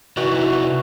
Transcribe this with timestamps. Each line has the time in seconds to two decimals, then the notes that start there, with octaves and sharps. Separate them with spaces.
0.17 C3 E3 D#4 F#4 D5 C#6